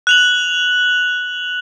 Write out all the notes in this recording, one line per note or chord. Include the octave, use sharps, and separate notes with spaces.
F#6 F7 F#7